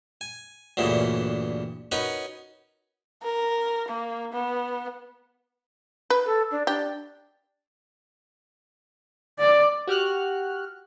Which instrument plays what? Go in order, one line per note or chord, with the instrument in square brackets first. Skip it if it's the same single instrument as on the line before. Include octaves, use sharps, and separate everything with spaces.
[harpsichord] G#5
D2 G2 A#2 C#3 E3
C#4 D#4 F#4 A#4 B4
[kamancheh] A#4
A#3
B3
[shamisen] B4
[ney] A4
D4
[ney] D4 [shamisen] G4
[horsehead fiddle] D5
[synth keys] F#4 G4 F6 F#6